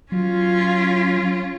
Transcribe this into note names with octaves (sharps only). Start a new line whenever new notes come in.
F#3 C#4 F4